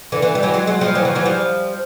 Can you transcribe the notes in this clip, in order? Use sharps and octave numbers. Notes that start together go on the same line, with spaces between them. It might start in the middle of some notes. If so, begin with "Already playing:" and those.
D3 E3
D3 E3
G3
E3 F#3
F#3 G#3
F#3 G#3
F3 G3
E3 F#3
D#3 F3
E3 F#3
F3 G3